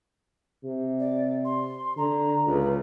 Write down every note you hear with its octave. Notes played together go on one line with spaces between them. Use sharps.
C3
D5
C6
D3 A#5
C#2 B4